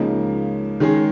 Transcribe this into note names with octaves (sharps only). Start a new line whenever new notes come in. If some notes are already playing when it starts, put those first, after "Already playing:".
Already playing: C#2 C#3 F3 A#3 D#4
D#3 G#3 C#4 G#4